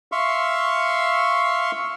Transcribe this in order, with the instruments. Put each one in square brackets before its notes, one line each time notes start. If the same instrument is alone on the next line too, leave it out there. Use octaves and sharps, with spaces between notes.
[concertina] E5 F5 C6 C#6